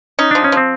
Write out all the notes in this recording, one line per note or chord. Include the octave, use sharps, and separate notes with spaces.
C#4 D#4
F3 D4
C#4
F3 C4